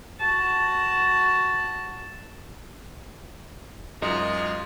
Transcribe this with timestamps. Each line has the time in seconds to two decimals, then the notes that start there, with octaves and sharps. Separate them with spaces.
0.20 F#4 A5
4.02 F#2 G#3 D#4 F4